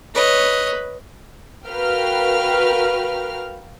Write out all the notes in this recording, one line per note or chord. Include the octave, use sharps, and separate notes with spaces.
B4 C#5 D#5
F#4 A#4 B4 F5 G5 F6